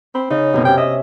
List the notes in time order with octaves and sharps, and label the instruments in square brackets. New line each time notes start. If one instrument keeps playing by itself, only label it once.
[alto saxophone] C4 [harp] B5
[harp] C#3 [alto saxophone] D#4
[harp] F#2 B2 C4
[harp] C3 C#4 [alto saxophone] G5
[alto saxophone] D#5 [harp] E5